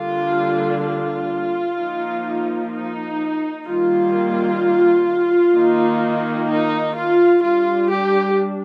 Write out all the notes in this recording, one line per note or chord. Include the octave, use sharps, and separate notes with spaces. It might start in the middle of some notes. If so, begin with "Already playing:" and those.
Already playing: D3 G3 A#3 D4 F4
F4
F3 A#3 D#4
D#4
D#3 G3 A#3 F4
D#3 A#3 D#4
D#4
F4
G3 D4 F4
G4